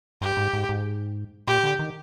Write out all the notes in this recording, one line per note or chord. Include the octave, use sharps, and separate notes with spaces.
G2 G4
G#2
G#2
G#2
A#2 G4
D3
D#3